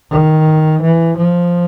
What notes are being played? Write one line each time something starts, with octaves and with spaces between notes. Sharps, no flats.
D#3
E3
F3